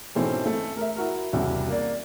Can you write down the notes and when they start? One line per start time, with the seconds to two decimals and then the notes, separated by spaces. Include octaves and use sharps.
0.15 G#2 B2 E3 A3 C4 C#4
0.46 A3
0.77 A#4 E5
0.96 E4 F#4 A#4
1.33 E1 C2 C#3 G3 E4 F#4
1.68 A#3 D5